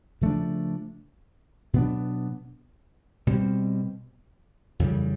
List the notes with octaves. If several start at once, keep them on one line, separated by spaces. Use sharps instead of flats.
C#3 F3 A3 D4
B2 F#3 B3 D4
B2 G3 C4
F2 C#3 E3 G3